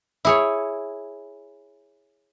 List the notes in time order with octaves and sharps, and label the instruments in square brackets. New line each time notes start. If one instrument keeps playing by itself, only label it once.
[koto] E4 G#4 C#5